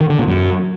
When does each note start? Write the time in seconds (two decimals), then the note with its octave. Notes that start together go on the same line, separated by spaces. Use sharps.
0.01 D#3
0.10 D3
0.18 A#2
0.27 F#2